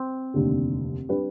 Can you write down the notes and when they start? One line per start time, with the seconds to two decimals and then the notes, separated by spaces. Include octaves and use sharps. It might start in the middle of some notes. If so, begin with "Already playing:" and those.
Already playing: C4
0.34 F1 D#2 D3
1.09 G3 D4 G4 B4